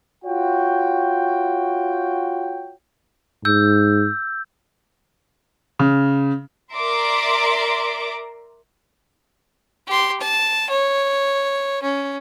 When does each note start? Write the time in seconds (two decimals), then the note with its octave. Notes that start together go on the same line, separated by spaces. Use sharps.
0.24 F4 F#4 C#5 G5
3.45 G#2 E6 G6
5.79 C#3
6.74 A#4 D5 E5 A#5 C6 D6
9.87 G4 C6
10.20 A5
10.70 C#5
11.82 C#4